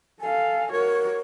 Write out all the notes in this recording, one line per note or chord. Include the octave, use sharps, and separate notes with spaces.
A4 F5 G#5
F#4 A#4 C#5